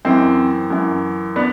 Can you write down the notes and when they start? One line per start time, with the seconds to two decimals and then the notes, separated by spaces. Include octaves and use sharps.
0.05 F#2 E3 C4
0.70 F#2 E3
1.36 B3 D4